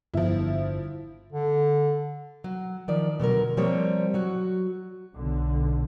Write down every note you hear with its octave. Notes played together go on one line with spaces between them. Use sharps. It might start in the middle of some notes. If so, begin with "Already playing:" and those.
G1 F3 E4
D3
F#3
D#3 F3 D5
B2 D3 F#3 A#4
F3 G3 A#3 C4 C#5
F#3 F#4
B1 D3